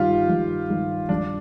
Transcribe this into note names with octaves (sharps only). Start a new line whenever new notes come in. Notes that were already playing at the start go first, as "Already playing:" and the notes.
Already playing: G2 D#3 G3 F4 G4
G2
D#3 G3
G2 D4